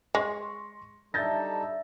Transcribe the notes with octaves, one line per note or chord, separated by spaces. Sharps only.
G#3 C6 C#6 A#6
G3 D4 D#4 A4 E5 G6 A6 A#6